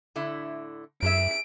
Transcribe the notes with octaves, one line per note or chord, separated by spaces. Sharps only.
A2 D3 E4
F#2 E4 G#4 E5 D7